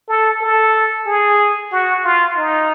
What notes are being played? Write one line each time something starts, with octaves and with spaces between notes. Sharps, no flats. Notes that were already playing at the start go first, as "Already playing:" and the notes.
A4
A4
G#4
F#4
F4
D#4